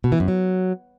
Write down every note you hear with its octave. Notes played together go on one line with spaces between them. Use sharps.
B2
E3
F#2
F#3